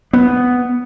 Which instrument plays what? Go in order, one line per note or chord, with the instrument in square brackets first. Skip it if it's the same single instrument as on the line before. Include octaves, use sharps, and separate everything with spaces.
[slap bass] B3